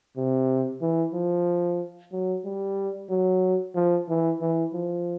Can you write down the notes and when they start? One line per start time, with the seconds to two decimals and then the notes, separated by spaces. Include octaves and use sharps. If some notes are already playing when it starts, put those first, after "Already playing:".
0.17 C3
0.82 E3
1.14 F3
2.12 F#3
2.45 G3
3.10 F#3
3.75 F3
4.09 E3
4.41 E3
4.74 F3